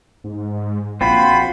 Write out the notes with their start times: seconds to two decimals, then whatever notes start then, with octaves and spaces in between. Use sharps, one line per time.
0.24 G#2
1.01 A#1 C4 F4 F#4 B5